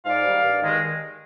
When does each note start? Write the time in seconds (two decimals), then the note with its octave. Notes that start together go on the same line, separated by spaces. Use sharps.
0.06 G#2 D5 F5
0.25 D#3 G3
0.43 G2
0.62 D#3 G#3